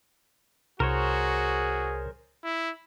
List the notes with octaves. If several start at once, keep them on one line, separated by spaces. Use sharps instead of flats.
C2 F#4 G#4 A#4 C5 C#5
E4